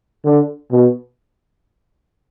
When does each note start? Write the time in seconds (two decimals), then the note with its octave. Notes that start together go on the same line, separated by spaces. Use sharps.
0.25 D3
0.71 B2